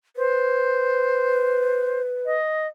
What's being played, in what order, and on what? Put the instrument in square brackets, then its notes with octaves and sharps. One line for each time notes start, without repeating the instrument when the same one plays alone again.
[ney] B4 [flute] C5
[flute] D#5